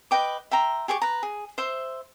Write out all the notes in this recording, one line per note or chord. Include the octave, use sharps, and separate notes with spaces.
B4 D#5 G5 D6
E5 G5 A#5 C6
G4 G#4 C#6 D6
B4 A#5
G#4
C5 E5 C6